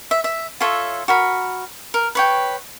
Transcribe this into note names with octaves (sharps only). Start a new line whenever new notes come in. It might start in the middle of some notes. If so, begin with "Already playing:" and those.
E5
E5
F4 A4 C#5 E5
F#4 A#4 B5
A#4
B4 C#5 G5